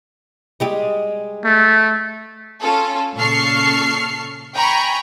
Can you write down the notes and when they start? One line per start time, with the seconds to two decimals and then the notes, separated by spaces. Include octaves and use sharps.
0.60 G3 G#3 G4
1.44 A3
2.61 C#4 F4 A4
3.16 A#2 C#3 A4 C#6 F6 C7
4.55 G5 G#5 A#5 B5 C#6